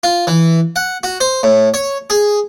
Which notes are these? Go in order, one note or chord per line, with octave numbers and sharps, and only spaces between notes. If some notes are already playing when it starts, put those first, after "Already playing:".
F4
E3
F#5
F#4
C5
A2
C#5
G#4